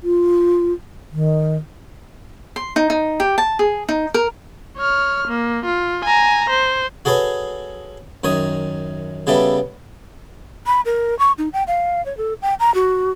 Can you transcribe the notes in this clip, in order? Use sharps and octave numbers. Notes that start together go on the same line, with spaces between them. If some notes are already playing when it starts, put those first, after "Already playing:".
F4
D#3
C6
D#4
D#4
G4
A5
G#4
D#4
A#4
C#5 F6
A#3
F4
G#5 A#5
C5
F#4 G#4 A4 B4 C#5
F#2 D#3 C#5 D#6
C#3 G3 B3 A4 E5
B5
A#4
C#6
D#4
G5
F5
C#5
A4
G5
A#5
F#4